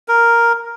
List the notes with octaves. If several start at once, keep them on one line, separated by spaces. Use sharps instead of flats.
A#4